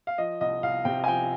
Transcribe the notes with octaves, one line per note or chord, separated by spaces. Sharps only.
F5
F3 D#5
C2 D#5
C2 F5
C3 G5
G#5
F3 G5